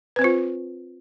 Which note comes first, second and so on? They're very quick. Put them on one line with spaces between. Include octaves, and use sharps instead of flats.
B4 C4 C5 F4